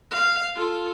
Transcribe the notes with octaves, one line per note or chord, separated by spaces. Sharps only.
F5
F4 A4